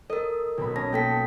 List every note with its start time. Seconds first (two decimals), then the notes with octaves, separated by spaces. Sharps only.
0.10 A4 A#4 D#5 A6
0.58 B1 B2 B5
0.76 C#4 A5 A#6
0.93 A#3 A4 G5 A5 B6 C#7